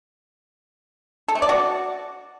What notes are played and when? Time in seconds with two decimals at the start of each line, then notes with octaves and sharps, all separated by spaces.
1.28 A4
1.35 A3
1.42 D5
1.49 F#4